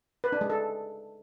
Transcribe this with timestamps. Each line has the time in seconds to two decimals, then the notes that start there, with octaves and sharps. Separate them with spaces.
0.24 B4
0.32 D4
0.41 G#3
0.50 A4